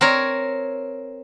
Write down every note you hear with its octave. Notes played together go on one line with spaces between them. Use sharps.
C4 A#4 C#5